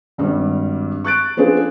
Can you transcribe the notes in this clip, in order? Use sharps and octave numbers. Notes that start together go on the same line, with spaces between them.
G#1 G2 G3
C#6 F#6 A6 D7
F3 B3 D4 G#4 A4 C5